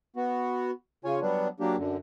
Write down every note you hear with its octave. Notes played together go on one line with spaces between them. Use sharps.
B3 F#4
C#3 F4 C#5 G#5
F#3 G3 B3 D4
F#3 A#3 D4 G4
F#2 D3